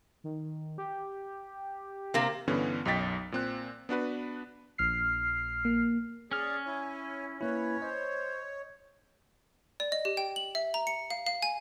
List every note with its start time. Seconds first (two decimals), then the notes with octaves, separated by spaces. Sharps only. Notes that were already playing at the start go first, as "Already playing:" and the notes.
0.24 D#3
0.78 G4
2.14 C3 A#3
2.48 G2 D3 E3 B3 C#4
2.85 B1 F#2 D#5 G5 A6 B6
3.32 A#2 C4 F#6
3.89 B3 D4 F#4 B4
4.78 A#1 F6 C7
5.65 A#3
6.31 C#4 G#4 D5 F6
6.65 E4 C#5 G#5
7.41 A#3 E4 B4 C#5
7.82 C5 D#5
9.80 D5
9.92 D#5
10.05 G4
10.17 G5
10.36 F#7
10.55 E5
10.74 A#5
10.87 C#7
11.10 F5
11.26 F5
11.42 G#5